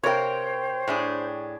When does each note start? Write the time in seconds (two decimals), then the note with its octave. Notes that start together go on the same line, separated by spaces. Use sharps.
0.03 C3 A#4 C5 C#5 G5 G6
0.88 A2 D4 G#4